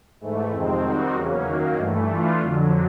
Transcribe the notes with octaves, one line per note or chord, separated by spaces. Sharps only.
G#2 E3 A3
F2 C3 D#3 G#3 C4
D#3 G3 C4 D#4 F#4
E2 C#3 F#3 A#3 C#4
F#2 D#3 F#3 A#3
G2 E3 A3
E3 A3 D4 F4
F2 D3 F#3